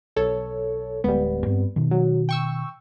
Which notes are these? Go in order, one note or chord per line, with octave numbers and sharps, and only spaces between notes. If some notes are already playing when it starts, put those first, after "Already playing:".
B1 A4 C#5
D1 G3 G#3 B3
G2 C4
B2 D#3
F#3
G5 C#6 E6